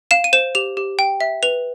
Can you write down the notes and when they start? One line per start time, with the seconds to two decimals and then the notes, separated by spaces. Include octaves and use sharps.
0.11 F5 E7
0.24 D#7
0.33 C5 E7
0.55 G4 F7
0.77 G4
0.99 G5
1.21 E5
1.43 B4 F7